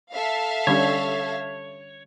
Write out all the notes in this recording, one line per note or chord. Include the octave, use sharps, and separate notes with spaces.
A4 E5 F5
D3 G3 C#4 C#5